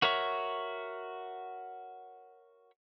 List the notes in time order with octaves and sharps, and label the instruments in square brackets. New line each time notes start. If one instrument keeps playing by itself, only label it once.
[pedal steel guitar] F#4 A#4 C#5 E5 C#6